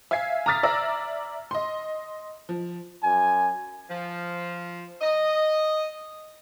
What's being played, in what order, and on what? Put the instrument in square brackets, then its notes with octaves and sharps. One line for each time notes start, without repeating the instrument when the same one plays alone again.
[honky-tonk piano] E5 F5 G#5 G#6 C7
A#5 D6 D#6 F6 A6 B6
D5 E5 A#5 E6 A#6
D#5 C6
F3
[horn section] F#2 G#5
[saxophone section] F3
D#5